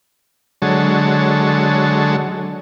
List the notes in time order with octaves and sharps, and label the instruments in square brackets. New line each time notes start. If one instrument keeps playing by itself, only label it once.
[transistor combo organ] D3 F#3 G#3 A4 C#5